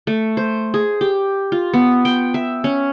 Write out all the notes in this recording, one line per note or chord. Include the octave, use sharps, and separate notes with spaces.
A3
C5
G#4
G4
F4
B3
G5
E5
C#4